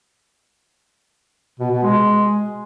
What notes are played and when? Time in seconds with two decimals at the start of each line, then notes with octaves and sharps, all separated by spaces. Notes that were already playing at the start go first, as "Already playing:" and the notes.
1.59 B2
1.71 B2
1.83 G#3